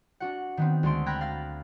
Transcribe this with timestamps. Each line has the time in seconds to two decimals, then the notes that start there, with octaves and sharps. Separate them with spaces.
0.20 D4 F#4 F#5
0.57 D#3 B3 C4
0.83 D2 G#3 A3 C6 D7
1.06 G5 A#5 B5 F#6 G#6 A#6
1.21 F5 B5 F6 A6 A#6